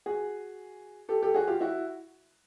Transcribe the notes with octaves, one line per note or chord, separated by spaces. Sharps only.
F#4 G#4
G4 A4
G4 A4
F#4 G#4
F4 G4
E4 F#4